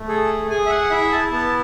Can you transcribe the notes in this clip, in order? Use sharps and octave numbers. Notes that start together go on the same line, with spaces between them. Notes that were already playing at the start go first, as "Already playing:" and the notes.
Already playing: A3
G#4 A4
G#4 G#5
E5
F#5
E4 E5
A5
B3 A5